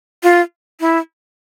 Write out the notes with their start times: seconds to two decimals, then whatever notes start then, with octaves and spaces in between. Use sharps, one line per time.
0.23 F4
0.80 E4